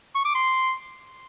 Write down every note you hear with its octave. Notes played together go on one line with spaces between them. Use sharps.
C#6
D6
C6